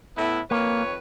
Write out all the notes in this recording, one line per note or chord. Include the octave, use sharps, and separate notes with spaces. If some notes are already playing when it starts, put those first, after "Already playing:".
A2 B3 E4
F2 D#3 A#3 B4 C#5